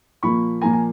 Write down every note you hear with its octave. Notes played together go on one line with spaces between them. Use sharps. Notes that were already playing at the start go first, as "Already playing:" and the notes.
A#2 F3 A#3 B5 C#6
A#2 F3 A#3 G#5 A#5
G#5